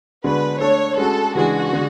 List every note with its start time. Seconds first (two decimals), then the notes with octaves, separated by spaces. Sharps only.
0.24 D3 G#3 B3 D4 F#4 B4
0.60 A3 D4 A4 C#5
0.97 G#3 C#4 F#4 A4
1.35 C#3 E3 G#3 D4 F#4 G#4
1.73 D3 G#3